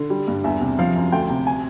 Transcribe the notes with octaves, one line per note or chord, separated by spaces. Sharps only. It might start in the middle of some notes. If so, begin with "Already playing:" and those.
Already playing: D3
G3
G2
E2 E5
C3
F3 F5
F#2
D2 G5
C3
G#5